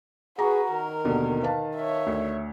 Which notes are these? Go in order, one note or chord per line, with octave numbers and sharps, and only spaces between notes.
F#4 G#4 B4 A#5 C#6
D#3 A#4
D#2 B2 D3
B4 F5 A5
C#5 E5
D2